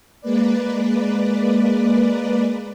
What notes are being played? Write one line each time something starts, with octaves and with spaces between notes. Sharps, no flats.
G#3 A#3 B4 D5